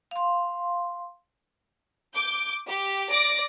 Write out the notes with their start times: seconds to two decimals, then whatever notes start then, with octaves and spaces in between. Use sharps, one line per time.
0.11 F5 C6
2.15 D6 G6
2.69 G4
3.10 D5 D6 A#6